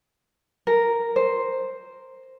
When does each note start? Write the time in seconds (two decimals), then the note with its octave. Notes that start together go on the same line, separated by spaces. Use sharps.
0.67 A#4
1.16 C5